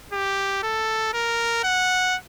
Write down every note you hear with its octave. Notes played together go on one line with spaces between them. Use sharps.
G4
A4
A#4
F#5